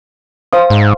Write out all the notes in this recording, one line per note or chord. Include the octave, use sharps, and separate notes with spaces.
C5 F5 D#6
G#2